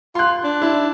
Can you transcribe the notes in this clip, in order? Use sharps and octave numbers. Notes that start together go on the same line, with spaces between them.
F4 C6 F#6
D4
E4